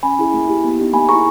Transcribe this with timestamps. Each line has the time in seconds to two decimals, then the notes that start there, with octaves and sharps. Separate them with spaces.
0.03 C#4 G#5 B5
0.19 E4 G#4
0.34 A#3
0.48 E4 G4
0.64 B3
0.79 D#4 G4
0.93 A#3 G#5 B5
1.09 E4 G#4 A#5 C#6